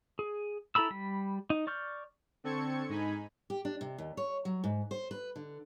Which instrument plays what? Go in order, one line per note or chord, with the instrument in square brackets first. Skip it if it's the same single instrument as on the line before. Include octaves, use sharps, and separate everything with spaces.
[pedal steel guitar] G#4
E4 A4 A#5 B5 E6
G3 B5
D#4
D5 C#6 F6 G6
[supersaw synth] D3 C4 A4 C#6 G#6 C#7
G#2 D#4 G#5 B5
[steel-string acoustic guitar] G4
D4
C3
D#2
C#5
F#3
G#2
C5
B4
D3